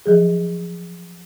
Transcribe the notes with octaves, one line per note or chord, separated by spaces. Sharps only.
F3 F#3 G#4